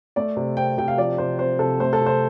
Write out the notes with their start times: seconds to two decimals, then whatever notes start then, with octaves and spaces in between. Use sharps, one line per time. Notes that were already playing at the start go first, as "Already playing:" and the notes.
0.16 A3 D5
0.37 C3
0.57 C4 G5
0.78 C3 G5
0.88 F5
0.98 F3 D5
1.18 C3 C5
1.39 C4 C5
1.59 C3 A4
1.80 A3 C5
1.93 A4
2.00 C3
2.06 C5